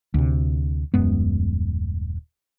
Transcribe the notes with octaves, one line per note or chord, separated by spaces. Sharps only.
D2 C3
D#1 F#2 G#3 B3